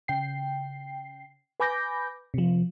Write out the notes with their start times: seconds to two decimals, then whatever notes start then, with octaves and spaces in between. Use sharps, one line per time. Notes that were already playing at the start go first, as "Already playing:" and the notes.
0.08 C#3 G5 C7
1.60 B4 G#5 B5 D6 G6 A#6
2.34 C3 F3